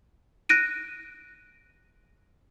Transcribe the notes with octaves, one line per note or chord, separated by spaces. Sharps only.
F#6 A#6 D7 D#7